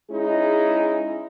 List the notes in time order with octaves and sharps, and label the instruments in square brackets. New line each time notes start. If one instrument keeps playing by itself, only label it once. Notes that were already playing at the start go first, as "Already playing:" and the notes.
[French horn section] G#3 C#4 D#4 E4 G#4